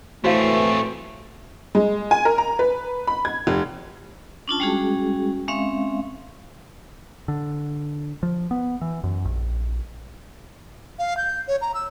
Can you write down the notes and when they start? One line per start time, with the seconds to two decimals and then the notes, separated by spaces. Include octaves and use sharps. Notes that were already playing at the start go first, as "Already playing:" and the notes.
0.24 A2 E3 A3 C4 F#4 C5 F5
1.75 G#3
2.11 G#5
2.25 A#4
2.38 A#5
2.59 B4
3.07 B5
3.25 G#6
3.47 F1
4.48 C#4 D4 F4 A5
4.60 G3 G#3 C#4 F#4 G#4
5.48 G#3 C4 C#4 E5 F5
7.28 D3
8.23 F3
8.51 B3
8.81 E3
9.04 F#2
9.25 A#1
10.99 F5
11.17 G6
11.47 C#5
11.61 A#5
11.74 E6